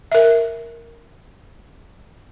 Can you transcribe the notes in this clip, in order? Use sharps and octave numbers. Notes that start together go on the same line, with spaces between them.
A#4 E5